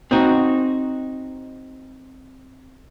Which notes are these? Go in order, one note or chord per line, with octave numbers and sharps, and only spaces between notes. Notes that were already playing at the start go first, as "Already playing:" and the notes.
C4 D#4 F#4